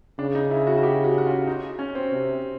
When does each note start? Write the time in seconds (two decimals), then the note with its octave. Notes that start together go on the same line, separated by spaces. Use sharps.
0.19 C#3 D4
0.35 D#4
0.51 E4
0.67 F#4
0.77 F#4
0.83 G4
1.04 F#4
1.18 F#4
1.26 F4
1.47 D#4
1.79 C#4
1.95 C4
2.11 C3